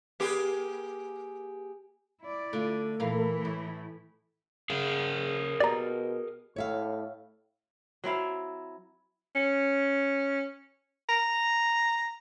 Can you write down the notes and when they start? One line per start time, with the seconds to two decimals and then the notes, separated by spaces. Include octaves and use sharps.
0.20 A#3 G4 G#4
2.22 E4 D5
2.53 D3 A3 F4
3.00 A#2 E3 E4 A#4 F5
3.45 A2
4.70 C#3 G#4 A#4 F5
5.60 B2 G4 D5 A#5
6.56 A2 C#5 E5 F5
8.04 F#3 C4 E4 F5
9.35 C#4
11.09 A#5